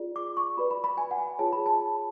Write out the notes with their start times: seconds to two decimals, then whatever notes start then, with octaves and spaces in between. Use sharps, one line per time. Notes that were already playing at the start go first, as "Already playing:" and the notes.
Already playing: F4 G#4 D5
0.16 D6
0.37 C#6
0.57 F#4 B4 D5 B5
0.71 B5
0.84 B5
0.98 G#5
1.11 F#5
1.19 G#5
1.39 F4 G#4 C#5 A5
1.53 B5
1.66 A5
1.80 B5